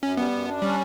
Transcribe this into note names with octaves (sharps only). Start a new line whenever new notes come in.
F#2 C#4
G3 B3
F#2
D4
G3 C#4